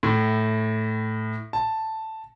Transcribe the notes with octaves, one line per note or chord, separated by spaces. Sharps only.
A2
A5